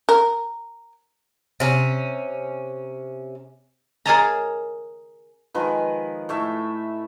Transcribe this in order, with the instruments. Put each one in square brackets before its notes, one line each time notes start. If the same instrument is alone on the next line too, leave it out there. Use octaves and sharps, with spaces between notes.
[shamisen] A#4
[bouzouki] C3 C#4
[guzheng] G#4 A#4 C#5 D#5 A5 A#5
[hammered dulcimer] D#3 F3 G#3 B4
A2 A3 E5